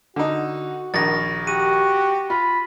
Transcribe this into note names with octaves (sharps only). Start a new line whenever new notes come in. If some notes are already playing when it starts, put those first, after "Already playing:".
D3 D#4 F#4
A#1 D#3 A6 A#6
F#4 G4 D#7
F4 B5